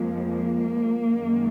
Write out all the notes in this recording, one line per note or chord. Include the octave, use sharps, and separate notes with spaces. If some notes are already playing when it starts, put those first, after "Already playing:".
Already playing: F2 F3 G#3 A#3
A#3
F#2 D#3 G#3